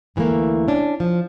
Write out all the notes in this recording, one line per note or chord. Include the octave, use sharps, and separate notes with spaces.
D2 E3 F3 A3 A#3
C#4 D4
F3